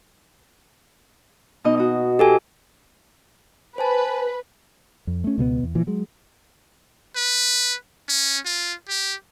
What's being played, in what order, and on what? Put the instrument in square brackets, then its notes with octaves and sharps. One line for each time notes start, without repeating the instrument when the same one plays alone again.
[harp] B2 D#4 D#5
F#4 D#5
[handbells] G4 A4 G#5
[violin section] B4 [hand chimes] C5 G#5 A5
[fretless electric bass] F2
A3 C#4
C#2 B2 G#3 B3
E2
A#2 E3 F3
F#3 G#3
[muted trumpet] B4
C#4
F4
G4